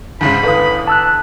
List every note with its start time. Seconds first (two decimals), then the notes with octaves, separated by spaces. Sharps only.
0.21 D2 G#2 C#3 B5
0.43 G1 E2 A4 B4 F5 D#6
0.87 A5 E6 F#6